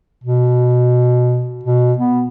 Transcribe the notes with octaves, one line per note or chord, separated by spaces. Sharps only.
B2
B2
B3